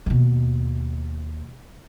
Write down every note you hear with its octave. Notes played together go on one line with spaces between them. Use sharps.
D#2 B2